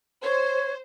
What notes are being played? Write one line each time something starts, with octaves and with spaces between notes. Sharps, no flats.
C5 C#5